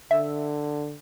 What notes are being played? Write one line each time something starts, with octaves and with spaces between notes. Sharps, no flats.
D3 E5